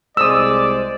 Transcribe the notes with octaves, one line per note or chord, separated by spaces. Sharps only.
C2 G#3 C5 D5 D#6 E6